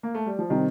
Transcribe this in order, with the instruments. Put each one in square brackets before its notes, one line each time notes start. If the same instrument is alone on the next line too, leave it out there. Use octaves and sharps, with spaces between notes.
[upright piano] A#3
A3
G3
F3
[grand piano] C3 G3 C4 D#4 [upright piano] D#3